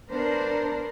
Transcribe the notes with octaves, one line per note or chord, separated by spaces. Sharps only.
B3 D4 A#4 C5